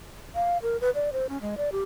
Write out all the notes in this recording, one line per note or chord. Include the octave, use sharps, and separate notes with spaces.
F5
A#4
B4
D5
C5
C#4
G#3
D5
G4